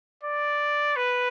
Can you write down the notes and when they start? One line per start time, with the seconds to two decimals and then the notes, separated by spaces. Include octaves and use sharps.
0.23 D5
0.96 B4